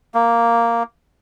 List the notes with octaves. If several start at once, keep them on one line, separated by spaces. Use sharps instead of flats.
A#3